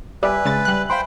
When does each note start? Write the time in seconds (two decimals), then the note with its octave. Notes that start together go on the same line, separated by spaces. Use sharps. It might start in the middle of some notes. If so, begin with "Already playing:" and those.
0.23 G3 B4 D5 E5 G#5
0.45 C#3 G#3 A6
0.65 G3 F#6
0.90 C5 F5 G5 B5 C6